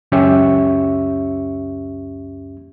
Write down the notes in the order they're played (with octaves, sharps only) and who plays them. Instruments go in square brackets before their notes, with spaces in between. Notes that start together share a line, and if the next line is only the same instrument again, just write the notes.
[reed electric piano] C#2 F#2 C#4 G4 E5 C#6